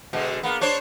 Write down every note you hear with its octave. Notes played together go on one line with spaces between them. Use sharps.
B2 D3 G#3
A#3 B3
D4 C5 C#5